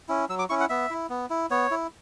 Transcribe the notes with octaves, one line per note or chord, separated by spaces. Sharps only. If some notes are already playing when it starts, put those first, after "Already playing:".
C#4 E4
F#3 E6
D6
C#4 E4 C#6
F#5
B3 E5
E4
B3
E4
B3 C#5
E4